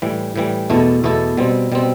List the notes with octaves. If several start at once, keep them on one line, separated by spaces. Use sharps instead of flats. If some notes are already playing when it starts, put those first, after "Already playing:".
A2 E3 G3
A2 E3 G3
E2 B2 A3 E4 A4
E2 B2 A3 E4 A4
B2 G3 C4
B2 G3 C4